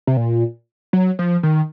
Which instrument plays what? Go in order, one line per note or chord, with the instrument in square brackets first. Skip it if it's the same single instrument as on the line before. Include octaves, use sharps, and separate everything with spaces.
[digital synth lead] C3
A#2
F#3
F3
D#3